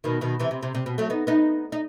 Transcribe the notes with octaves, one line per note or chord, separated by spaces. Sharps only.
B2 D#3
B2 D#3
C3 E3
C3
C3
C3
B2
F#3 A3
B3 D#4
B3 D#4
D#4